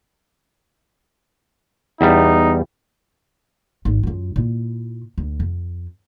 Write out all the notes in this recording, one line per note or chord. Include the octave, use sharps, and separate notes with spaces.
E2 G3 D#4
G#1
F#2 F4
A#2 E4
D2
F2